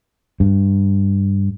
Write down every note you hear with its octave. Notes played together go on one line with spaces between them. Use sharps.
G2